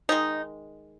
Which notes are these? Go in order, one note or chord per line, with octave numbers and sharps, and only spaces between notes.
D#3 G#3 D#4